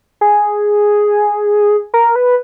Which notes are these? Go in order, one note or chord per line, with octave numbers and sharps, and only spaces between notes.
G#4
A#4
B4